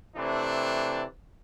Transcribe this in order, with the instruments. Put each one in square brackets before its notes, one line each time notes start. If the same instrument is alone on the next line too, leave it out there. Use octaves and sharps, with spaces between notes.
[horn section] C3 E3 A3 C4 D4